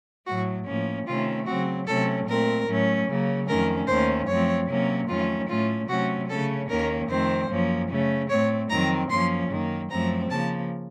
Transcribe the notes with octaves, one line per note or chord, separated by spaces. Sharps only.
A2 F#3 A3 F#4
A2 F3 A#3 C#4
C3 D#3 A3 C#4 F4
C#3 F#3 C4 F#4
C3 F#3 A3 C#4 A4
A#2 A3 C4 A#4
A2 F#3 A3 C#4
C#3 F#3 A#3
F2 D#3 A3 C#4 A#4
D#2 D#3 A3 C#4 C5
F#2 F3 A3 C4 C#5
C3 F#3 A#3 C#4
F2 D#3 F#3 A3 C#4 F4
A2 A3 C#4 F4
C3 F#3 A3 C#4 F#4
C#3 A3 C#4 A4
D#2 D#3 A#3 C#4 A#4
F2 D#3 A3 C4 C5
F#2 F3 A#3 C#4
C#3 A3 C#4
A2 A3 C4 C#5
F2 D#3 F#3 C4 A#5
F#2 F3 A#3 C#4 C6
F#2 D#3 A#3
F#2 F3 A3 C4 A#5
C#3 F3 A#3 A5